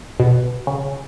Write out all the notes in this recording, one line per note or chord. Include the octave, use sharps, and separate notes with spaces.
B2
C#3